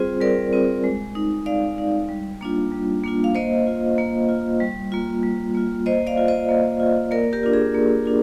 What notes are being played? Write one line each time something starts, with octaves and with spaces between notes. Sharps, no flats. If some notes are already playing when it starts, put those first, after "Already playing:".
Already playing: G3 C4 F4 G#4 C5
G3 A#4 D5
C4 F4
G#3
D#4
G#3 D5 F5
D#4
G3
A#3 D4 F4
G3
A#3 D4 F4
F5
A#3 C5 D#5
F4
A#3
F4
G3
A#3 F4
G3
A#3 F4
A#3 C5 D#5
D5 F5
F4
C5 D#5
A#3
F4
A#3 A#4 D5
G4 A#4
D4 F4
G#4
A#3
D4 F4